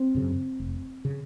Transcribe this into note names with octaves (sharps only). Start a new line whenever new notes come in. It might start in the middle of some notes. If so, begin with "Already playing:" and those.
Already playing: C4
F#2 C#3
F1
C#3